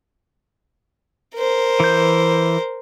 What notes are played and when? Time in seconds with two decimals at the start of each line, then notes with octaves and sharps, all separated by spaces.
1.35 A#4 C5
1.80 E3 G6